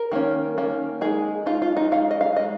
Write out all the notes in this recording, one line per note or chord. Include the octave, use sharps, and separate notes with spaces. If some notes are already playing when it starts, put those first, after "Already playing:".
Already playing: A#4
D#3 A#3 C#4
D#3 A#3 C#4
G#3 D#4 G#4
G#3 D#4 F4
F4
D#4
G#3 D#4 F5
D#5
F5
G#3 D#4 D#5